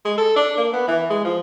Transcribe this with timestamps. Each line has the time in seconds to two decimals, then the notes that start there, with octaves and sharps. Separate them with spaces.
0.05 G#3
0.18 A4
0.36 D4
0.57 A#3
0.73 B3
0.88 E3
1.10 G#3
1.25 F3